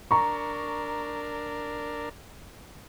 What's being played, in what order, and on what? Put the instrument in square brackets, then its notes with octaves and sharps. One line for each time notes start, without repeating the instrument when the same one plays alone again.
[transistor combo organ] D4 A#4 [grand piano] A#5 C#6